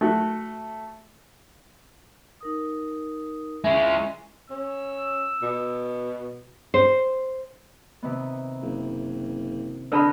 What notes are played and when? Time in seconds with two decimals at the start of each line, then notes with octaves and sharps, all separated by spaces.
0.01 A3 F#4
2.41 D#4 A#4 D#6
3.64 G#3 C#4 E4
4.50 C#4 E6
5.42 B2
6.74 C5
8.03 C3 D#3 B3
8.62 F#1
9.92 D3 B3 B4 D#5 A5 B5